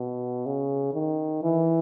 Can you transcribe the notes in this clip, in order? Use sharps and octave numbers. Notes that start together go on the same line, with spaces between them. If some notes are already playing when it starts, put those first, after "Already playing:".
Already playing: B2
C#3
D#3
E3